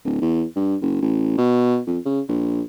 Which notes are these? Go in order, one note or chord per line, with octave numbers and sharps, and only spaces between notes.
D1
E2
G2
F#1
A1
B2
F2
C#3
A#1